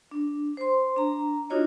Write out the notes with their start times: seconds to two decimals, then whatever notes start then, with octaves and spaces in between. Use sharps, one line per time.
0.11 D4
0.57 C5 C6
0.96 D4 A#5
1.50 D4 D#4 F4 F#4 C#5 D#5